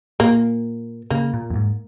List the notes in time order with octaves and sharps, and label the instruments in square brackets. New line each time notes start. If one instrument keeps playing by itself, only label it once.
[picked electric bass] A#2 [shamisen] A#3
[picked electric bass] C#3 [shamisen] A#3
[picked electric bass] A#2
F2
G#2